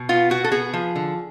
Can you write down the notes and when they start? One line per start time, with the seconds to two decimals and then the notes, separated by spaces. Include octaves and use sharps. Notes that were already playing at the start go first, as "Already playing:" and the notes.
Already playing: B2
0.09 B3 F4
0.30 B2 F#4
0.44 A4
0.51 B3 G#4
0.73 F3
0.96 D3